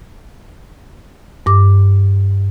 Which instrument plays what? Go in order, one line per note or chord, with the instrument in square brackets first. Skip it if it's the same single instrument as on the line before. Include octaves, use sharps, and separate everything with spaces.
[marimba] G2 D6